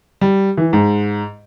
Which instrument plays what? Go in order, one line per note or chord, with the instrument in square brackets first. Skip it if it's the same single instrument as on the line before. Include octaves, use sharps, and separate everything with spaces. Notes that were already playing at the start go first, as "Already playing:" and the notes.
[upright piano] G3
E3
G#2